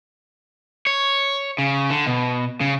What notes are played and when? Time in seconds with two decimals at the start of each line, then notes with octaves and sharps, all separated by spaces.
0.87 C#5
1.58 C#3
1.90 D3
2.06 B2
2.61 C#3